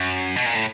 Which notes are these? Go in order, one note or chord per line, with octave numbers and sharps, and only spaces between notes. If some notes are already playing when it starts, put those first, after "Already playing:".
Already playing: F#2
B2
A#2
A2